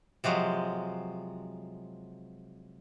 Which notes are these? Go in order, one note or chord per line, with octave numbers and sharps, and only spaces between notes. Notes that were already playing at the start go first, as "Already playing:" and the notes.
C3 F3 F#3 G#3